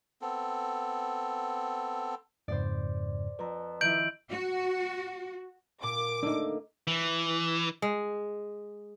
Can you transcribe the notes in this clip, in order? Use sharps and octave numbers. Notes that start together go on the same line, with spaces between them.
B3 C4 A4
F2 G#2 C#3 C5 D5
F2 B4 A#5
D#3 F3 E4 G6 D7 F#7
F#4
A#2 D6
A3 A#3 D4 D#4
E3
G#3